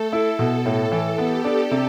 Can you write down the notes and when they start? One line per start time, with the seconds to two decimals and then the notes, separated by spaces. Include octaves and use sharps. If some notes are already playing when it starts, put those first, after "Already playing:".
Already playing: A3 A4
0.13 E4
0.39 B2
0.66 A2
0.92 E3
1.18 B3 G4
1.44 D4
1.71 C3